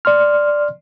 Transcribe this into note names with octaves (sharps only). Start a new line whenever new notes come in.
D5 C6 F6